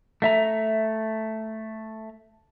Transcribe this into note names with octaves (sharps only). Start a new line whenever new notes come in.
A3 E5 A#5